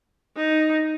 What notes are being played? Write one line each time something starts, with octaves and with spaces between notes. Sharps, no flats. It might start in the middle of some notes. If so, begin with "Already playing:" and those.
D#4